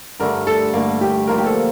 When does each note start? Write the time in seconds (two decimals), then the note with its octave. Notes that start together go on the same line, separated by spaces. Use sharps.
0.20 G2 D3 A3 A#4
0.47 A4
0.73 G2 D3 A3 A#3
1.01 G4
1.27 F3 A#3 F4 A#4
1.38 G4
1.46 A4